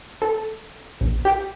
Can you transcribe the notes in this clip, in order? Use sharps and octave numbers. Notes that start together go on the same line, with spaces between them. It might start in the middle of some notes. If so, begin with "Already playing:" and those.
A4
A#1
G4